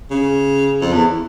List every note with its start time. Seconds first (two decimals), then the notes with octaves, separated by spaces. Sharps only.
0.11 C#3
0.81 F2
0.93 E2